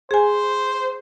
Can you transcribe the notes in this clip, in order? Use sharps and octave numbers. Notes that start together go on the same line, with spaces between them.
G#4 C5 G#5